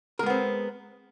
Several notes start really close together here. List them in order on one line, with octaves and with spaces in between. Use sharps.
A#4 G#3 B3 C4